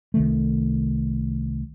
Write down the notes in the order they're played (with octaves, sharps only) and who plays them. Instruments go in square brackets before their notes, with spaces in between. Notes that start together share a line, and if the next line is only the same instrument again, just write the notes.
[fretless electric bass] C2 D#3 A3